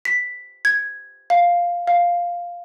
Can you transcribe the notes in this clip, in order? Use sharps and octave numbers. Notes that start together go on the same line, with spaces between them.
B6
G#6
F5
F5